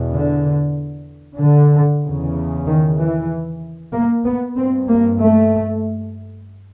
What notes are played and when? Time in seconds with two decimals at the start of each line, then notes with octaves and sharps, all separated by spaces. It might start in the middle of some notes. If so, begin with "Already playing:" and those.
Already playing: E2 B2
0.11 D3
1.39 D3
2.02 E2 C#3
2.66 D#3
2.97 E3
3.93 A#3
4.25 B3
4.57 G2 C4
4.88 A#3
5.20 A3